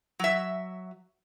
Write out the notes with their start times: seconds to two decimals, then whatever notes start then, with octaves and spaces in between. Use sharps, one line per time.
0.19 F#3 E5